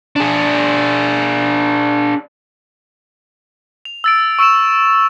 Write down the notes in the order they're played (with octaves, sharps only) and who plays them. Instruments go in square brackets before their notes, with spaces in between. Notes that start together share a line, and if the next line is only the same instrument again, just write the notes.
[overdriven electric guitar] D4 G#4
[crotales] F7
E6 A6 D7
C#6 E6 D7 E7